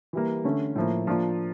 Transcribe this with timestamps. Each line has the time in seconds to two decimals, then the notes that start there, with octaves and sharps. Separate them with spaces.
0.13 E3 G3 A#3
0.44 D3 A3 C#4
0.75 A2 F3 A#3
1.07 F3 A#3 D4 F4